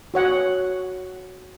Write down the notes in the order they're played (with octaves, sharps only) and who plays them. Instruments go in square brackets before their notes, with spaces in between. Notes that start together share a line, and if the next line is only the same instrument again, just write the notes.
[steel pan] F#4 C#5 F#5